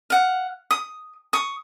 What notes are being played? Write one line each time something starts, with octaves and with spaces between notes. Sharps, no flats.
F5 F#5
D#6
C#6 D#6